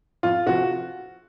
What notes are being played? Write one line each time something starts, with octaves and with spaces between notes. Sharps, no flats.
F2 F4
C3 F3 F#4